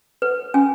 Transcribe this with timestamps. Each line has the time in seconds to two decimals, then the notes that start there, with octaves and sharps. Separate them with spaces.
0.22 B4
0.54 C#4 G#5